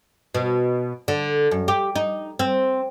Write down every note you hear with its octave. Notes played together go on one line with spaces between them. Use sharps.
B2
D3
F#2
G4
D#4
C4